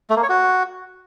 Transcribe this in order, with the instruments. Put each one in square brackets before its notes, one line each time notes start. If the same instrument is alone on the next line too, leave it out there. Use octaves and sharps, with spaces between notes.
[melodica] A3
A#3
C#5
F#4